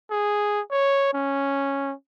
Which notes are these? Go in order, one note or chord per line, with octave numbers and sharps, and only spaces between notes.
G#4
C#5
C#4